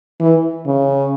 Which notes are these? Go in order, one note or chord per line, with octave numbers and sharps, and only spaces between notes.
E3
C#3